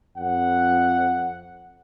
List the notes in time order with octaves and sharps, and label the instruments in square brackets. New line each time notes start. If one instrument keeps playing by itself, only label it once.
[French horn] F2 [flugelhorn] F#5